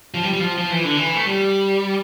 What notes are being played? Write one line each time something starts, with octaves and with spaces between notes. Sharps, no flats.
F3
G3
G3
F3
F3
E3
D3
E3
A3
G3